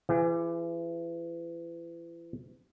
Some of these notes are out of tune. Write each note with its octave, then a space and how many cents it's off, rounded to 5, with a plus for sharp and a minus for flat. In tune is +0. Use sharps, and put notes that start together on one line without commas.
E3 +35 G#4 -5